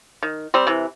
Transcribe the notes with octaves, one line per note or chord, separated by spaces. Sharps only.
D#3
G3 C4
C3 E3